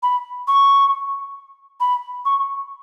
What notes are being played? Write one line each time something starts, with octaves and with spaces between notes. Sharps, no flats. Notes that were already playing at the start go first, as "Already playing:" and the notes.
B5
C#6
B5
C#6